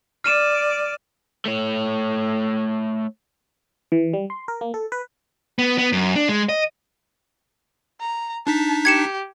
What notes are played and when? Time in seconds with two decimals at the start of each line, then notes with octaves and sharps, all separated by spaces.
0.24 D5 F6 D#7 E7
1.46 A3 C#5
3.92 E3
4.13 G3
4.30 C6
4.48 A#4
4.61 A#3
4.74 A4
4.92 B4
5.59 B3
5.78 B3
5.92 F#2
6.16 D4
6.29 G#3
6.49 D#5
8.01 A#5
8.47 D4 D#4 A5 B6
8.85 G4 G#6 C#7 E7